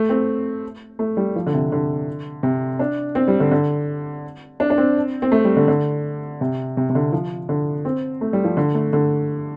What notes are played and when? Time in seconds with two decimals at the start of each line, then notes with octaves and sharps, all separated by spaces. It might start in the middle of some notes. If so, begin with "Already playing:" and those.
Already playing: A3
0.09 C4
0.99 A3
1.17 G3
1.36 F3
1.46 D3
1.54 C3
1.72 D3
2.43 C3
2.79 D4
3.15 C4
3.28 G3
3.40 D3
3.51 D3
4.60 D4
4.70 D4
4.78 C4
5.22 C4
5.32 A3
5.44 G3
5.57 D3
5.68 D3
6.41 C3
6.77 C3
6.90 C3
6.95 D3
7.12 F3
7.49 D3
7.85 C4
8.21 A3
8.33 G3
8.44 F3
8.57 D3
8.74 A3
8.93 D3